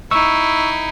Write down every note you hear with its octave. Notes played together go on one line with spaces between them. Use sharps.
D#4 E4 C#6 E6